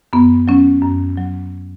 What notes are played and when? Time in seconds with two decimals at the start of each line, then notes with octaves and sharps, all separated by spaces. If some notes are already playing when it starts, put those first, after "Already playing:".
0.13 F#2 B3
0.48 F#3 C#4
0.82 F#2
1.17 F#3